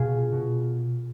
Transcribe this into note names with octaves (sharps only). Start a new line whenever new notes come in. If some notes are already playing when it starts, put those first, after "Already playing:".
Already playing: B2 F4 G#4
B2